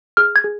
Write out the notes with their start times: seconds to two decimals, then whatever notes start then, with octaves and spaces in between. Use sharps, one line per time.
0.17 G#4 F6
0.36 G#6
0.44 G#4